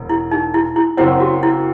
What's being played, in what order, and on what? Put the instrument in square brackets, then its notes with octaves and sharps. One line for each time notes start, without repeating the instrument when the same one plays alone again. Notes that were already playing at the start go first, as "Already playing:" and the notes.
Already playing: [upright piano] E1
[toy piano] E4
D#4
E4
E4
[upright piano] F#1 F#2 F#3 C4 [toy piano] E4
[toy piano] F#4
E4